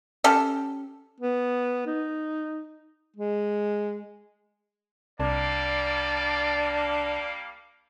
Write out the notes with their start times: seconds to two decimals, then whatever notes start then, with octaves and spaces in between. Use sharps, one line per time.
0.24 C#4 G4 A4
1.21 B3
1.87 D#4
3.16 G#3
5.20 C2 G3 A#3 D4 D5